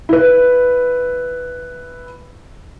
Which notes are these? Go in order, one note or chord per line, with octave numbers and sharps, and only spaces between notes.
E4 B4